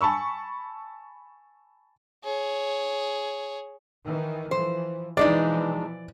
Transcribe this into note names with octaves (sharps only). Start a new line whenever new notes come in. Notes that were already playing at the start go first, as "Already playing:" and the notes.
G#5 A5 B5 C#6 E6
G#4 C#5
D#3 E3
E3 F3 C5
B2 E3 F3 G#3 D4 D#4 D5